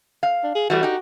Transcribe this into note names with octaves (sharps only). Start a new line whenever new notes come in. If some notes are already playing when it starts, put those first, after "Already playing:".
F5
D4
G#4
E3 G3 A3 F#4
D#4 G4